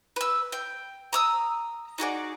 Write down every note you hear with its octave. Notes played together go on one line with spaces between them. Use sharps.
B4 E6
G5
A#5 D#6 E6
D#4 F#4 G#4 D5